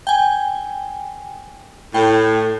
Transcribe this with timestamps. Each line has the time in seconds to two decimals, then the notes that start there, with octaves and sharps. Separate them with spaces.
0.07 G5 G#5
1.94 A2 G5